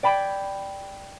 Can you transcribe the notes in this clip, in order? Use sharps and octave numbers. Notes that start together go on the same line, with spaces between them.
D5 G5 B5 G#6